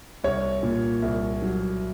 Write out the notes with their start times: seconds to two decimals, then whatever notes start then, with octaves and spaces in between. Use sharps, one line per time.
0.24 C2 C#5
0.63 A#2
1.02 C2
1.42 F#3